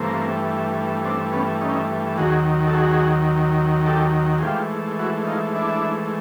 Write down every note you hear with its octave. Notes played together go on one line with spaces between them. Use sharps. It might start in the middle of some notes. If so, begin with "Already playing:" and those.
Already playing: G2 E3 A3 A#3 C4
C4 D4
B3 C#4
C#4 D#4
D#2 D#3 F#3 F#4 G#4
A4
F#4 G#4
G4 A4
G#4
G#2 E3 A3 F4 G4
E4 F#4
D#4 F4
D4 E4